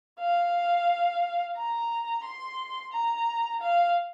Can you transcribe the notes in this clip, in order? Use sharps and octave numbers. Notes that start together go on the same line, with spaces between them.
F5
A#5
C6
A#5
F5